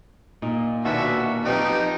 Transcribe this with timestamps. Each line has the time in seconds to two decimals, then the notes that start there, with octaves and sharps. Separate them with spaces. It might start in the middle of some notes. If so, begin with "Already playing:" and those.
0.42 A#2 D#4
0.85 D#2 B2 D4 F#4 E5
1.45 F3 B3 C4 D#4 G4